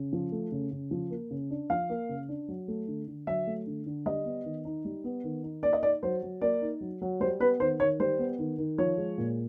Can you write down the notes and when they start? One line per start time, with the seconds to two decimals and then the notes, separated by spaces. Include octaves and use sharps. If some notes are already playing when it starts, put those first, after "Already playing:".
Already playing: C#3
0.13 F3
0.32 A3
0.52 C#3
0.71 C#3
0.91 F3
1.10 A#3
1.31 C#3
1.51 D4
1.70 F3 F5
1.90 A#3
2.09 C#3
2.29 D4
2.48 F#3
2.68 A3
2.88 D3
3.08 D3
3.27 F#3 E5
3.47 A3
3.66 D3
3.86 D3
4.06 G3 D#5
4.25 B3
4.45 D#3
4.65 D#4
4.85 G3
5.04 B3
5.24 D#3
5.44 D#4
5.63 A#3 D5
5.73 D#5
5.82 D#4 D5
6.03 F#3 C5
6.23 F#3
6.41 A#3 D5
6.62 D#4
6.81 F#3
7.02 F#3
7.20 G3 C5
7.40 B3 B4
7.60 D#3 C5
7.80 D#3 C#5
8.00 G3 C5
8.19 B3
8.39 D#3
8.58 D#3
8.78 F3 C#5
8.98 G#3
9.18 A#2